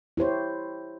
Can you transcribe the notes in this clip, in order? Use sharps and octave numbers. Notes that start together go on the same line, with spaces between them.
E4 G4 C5 C#5